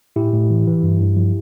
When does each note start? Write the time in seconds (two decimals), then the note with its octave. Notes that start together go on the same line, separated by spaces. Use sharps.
0.16 A2 E4 G4
0.33 A2
0.50 E3
0.67 E3
0.83 G2
1.01 G2
1.16 F3